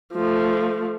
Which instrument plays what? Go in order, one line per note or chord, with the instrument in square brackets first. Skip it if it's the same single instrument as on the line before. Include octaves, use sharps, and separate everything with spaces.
[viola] F3 A3